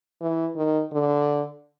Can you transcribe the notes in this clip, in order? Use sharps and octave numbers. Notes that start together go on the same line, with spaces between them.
E3
D#3
D3